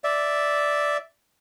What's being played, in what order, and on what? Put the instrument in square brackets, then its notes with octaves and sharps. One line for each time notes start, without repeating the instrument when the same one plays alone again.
[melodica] D5 E5